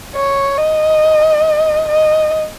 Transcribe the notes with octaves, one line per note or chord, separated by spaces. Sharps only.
C#5
D#5
D#5